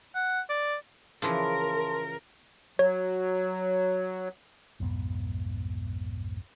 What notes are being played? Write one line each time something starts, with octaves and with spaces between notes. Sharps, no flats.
F#5
D5
C#3 E3 F3 A#4 A5 C6
F#3 C#5
B1 F2 G#2 B3